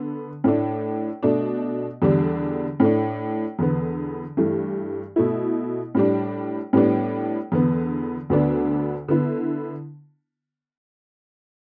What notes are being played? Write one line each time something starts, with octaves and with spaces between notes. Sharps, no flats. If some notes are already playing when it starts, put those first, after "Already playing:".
Already playing: D3 B3
A2 A3 D4
B2 A3 D4
E2 D3 G3 D4
A2 A3 D4
E2 D3 B3
G2 E3 A3
B2 A3 E4
A2 G3 D4
A2 G3 B3 D4
E2 D3 B3
D2 D3 B3 D4
D3 B3 E4